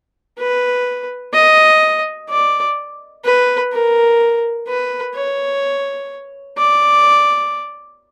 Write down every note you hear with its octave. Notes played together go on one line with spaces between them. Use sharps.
B4
D#5
D5
B4
A#4
B4
C#5
D5